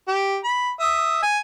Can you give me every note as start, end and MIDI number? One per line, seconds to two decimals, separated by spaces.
0.08 0.37 67
0.44 0.71 83
0.80 1.19 76
0.80 1.19 87
1.22 1.39 80